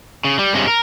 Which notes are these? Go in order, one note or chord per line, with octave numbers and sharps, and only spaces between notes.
C#3
G3
G2 C3 G#3 C#4
A#4